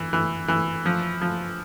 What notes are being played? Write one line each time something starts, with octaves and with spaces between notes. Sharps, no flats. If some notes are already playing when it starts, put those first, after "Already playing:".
Already playing: E3
E3
E3
F3
F3